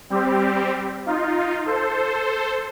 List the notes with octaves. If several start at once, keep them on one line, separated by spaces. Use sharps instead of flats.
G3 C4 G4
D#4 F4
A4 C5